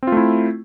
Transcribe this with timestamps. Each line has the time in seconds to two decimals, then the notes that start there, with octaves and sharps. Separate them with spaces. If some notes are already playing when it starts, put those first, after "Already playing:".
0.03 C4
0.07 F4
0.12 A3
0.17 E4